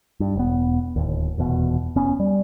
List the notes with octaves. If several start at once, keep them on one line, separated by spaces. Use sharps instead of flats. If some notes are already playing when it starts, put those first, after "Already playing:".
G2
E1 B3
D1 D#2
F1 E2 B2
F1 B3 C#4
G3